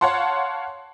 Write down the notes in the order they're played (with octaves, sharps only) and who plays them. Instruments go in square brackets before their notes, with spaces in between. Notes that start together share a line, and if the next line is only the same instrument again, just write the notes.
[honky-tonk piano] C#5 F5 F#5 A5 C6